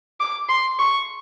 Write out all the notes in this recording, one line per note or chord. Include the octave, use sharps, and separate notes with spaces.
D6
C6
C#6